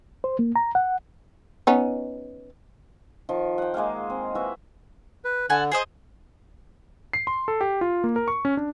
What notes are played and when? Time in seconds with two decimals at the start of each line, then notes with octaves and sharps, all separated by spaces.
0.24 C5
0.39 A#3
0.56 A#5
0.75 F#5
1.67 B3 C#4 D#4
3.29 D#3 F3
3.58 F#5 G5
3.74 G#3 A#3 G#4 F5
4.10 C4
4.35 E4 F#4 B4 E5
5.25 B4
5.50 D3 F#5 G#5 A5
5.72 G#4 C5 D#5
7.13 C7
7.27 C6
7.48 A4
7.61 G4
7.81 F4
8.04 A#3
8.16 A#4
8.28 C#6
8.45 C#4
8.57 D4